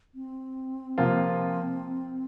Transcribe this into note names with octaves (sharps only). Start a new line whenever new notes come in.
C4
C3 F3 A#3 F4